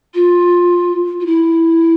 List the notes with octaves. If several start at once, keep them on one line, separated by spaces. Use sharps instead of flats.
F4
F4
E4